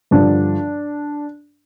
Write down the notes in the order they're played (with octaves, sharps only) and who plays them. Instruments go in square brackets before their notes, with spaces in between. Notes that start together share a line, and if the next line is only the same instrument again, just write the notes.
[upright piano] G2 D3 F3 D4